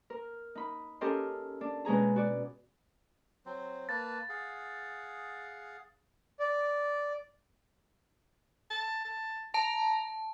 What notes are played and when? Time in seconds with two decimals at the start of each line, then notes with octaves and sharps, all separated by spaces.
0.10 A#4
0.55 D#4 B5
1.01 C#4 G4 A4 A#4 D#5 C6
1.61 D4
1.85 B2 G#3 C#4 G#4 A#5
2.16 F#4 D5
3.46 F#3 C4 C5
3.89 A#3 B4 A5 A6
4.29 G#4 F5 F#5
6.40 D5
8.70 A5
9.05 A5
9.54 A5 A#5